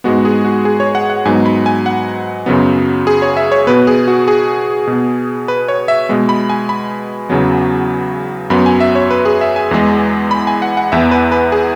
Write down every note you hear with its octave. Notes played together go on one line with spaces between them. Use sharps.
G#2 G#3 B3 F#4
G#4
F#4
G#4
C#5
F#5
F#5
G#2 F#3 B3 G#5
B5
G#5
F#5
F#2 C#3 F#3 B3
G#4
C#5
E5
C#5
B2 B3 B4
G#4
F#4
G#4
B2 B3
B4
C#5
E5
B2 G#3 B3
B5
G#5
B5
E2 C#3 F#3 B3
F#2 F#3 B3 B5
G#5
E5
C#5
B4
G#4
E5
G#5
E2 E3 G#3
B5
G#5
F#5
F#5
E2 E3 B3 E5
B4
B4
G#4